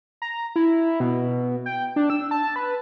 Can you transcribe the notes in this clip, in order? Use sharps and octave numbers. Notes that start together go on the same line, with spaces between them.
A#5
E4
B2
G5
D4
E6
A5
B4